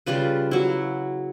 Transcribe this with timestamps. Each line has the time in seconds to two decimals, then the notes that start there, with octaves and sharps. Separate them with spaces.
0.06 C#3 G3 F4 B4
0.51 F#3 E4